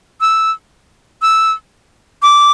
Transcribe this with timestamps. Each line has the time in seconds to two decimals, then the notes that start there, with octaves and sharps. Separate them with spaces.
0.21 E6
1.22 E6
2.22 D6